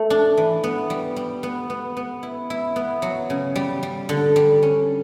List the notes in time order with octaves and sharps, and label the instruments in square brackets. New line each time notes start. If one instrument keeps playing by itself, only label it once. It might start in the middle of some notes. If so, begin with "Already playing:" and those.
Already playing: [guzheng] A3
D4
E3
B3
G3
G3
B3
B3
B3
E4
E4
B3
F#3
C#3
G3
G3
D3
G3
C#4